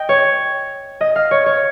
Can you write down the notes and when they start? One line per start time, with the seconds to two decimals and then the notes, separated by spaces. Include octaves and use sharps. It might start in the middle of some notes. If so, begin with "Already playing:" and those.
Already playing: D#5 G5
0.09 C#5
1.01 D#5
1.16 F5
1.31 C#5
1.46 C#5